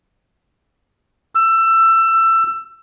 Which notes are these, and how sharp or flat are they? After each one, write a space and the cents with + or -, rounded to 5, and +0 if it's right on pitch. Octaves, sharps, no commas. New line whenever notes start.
E6 +20